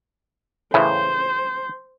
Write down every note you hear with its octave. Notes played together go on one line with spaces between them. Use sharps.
A2 C#3 E3 C5